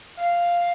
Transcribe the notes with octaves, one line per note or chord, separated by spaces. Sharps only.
F5